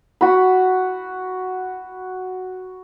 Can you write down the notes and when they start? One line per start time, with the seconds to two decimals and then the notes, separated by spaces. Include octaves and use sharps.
0.21 F#4 B5